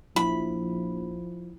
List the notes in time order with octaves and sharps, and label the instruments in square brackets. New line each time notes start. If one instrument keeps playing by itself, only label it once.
[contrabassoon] A#1 [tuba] F3 [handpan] E4 [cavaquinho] B5